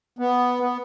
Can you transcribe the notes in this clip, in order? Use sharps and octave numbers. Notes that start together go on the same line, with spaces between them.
B3
B3